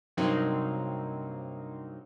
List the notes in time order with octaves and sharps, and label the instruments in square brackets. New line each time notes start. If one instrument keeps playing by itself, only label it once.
[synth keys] G2 C3 F#3 A#3 C4 D#4